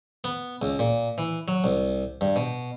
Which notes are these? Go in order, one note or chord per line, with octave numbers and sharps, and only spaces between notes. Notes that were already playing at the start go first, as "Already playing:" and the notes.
B3
C#2
A#2
E3
F#3
C2
G2
B2